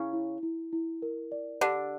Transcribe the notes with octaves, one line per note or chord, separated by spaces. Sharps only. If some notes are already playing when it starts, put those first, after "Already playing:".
Already playing: C#3 C#4 E4
E4
E4
E4
A#4
D5
D3 D4 G4